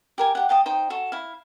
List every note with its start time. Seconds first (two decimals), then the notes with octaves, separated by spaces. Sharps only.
0.18 G4 A#4 G#5
0.35 G4 F#5
0.49 F5 G5 A5 D#6
0.66 D#4 C5 G5
0.90 F#4 A4
1.12 E4 F5